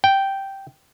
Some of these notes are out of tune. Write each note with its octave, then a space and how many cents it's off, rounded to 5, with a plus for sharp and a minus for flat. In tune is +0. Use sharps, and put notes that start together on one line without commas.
G5 -5